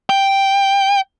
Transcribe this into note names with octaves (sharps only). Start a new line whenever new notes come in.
G5